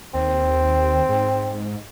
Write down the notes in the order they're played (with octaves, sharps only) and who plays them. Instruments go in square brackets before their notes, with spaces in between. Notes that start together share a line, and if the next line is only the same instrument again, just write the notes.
[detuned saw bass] D#2 [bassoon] C4
[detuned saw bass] G#2